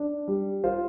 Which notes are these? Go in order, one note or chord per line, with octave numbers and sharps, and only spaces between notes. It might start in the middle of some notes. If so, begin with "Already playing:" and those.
Already playing: D4
G3
F4 C5